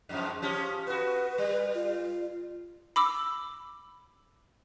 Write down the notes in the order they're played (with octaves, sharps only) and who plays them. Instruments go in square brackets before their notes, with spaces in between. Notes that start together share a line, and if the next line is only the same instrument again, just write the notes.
[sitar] F2 G#2 F3
F3 C#4 G4
[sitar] B3 F#4 [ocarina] B4
[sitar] G3
[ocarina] F4
[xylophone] B5 D6 E6